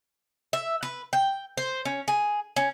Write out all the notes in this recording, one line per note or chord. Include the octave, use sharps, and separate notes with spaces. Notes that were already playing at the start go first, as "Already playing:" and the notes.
E5
B4
G5
C5
C#4
G#4
C#4